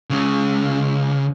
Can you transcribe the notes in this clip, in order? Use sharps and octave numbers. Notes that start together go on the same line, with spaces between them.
C#2 C#3